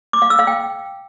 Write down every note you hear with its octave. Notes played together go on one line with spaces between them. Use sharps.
D6
F5
E6
F5
G5